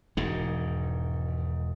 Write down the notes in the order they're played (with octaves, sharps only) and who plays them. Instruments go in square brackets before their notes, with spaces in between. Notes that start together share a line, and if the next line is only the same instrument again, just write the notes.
[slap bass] E1 G#2 D#3